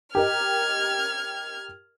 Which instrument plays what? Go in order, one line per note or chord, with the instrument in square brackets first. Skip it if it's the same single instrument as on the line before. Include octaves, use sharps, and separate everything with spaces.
[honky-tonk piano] G4 A#4 D#5 [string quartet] F6 G#6